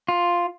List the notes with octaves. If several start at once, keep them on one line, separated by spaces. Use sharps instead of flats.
F4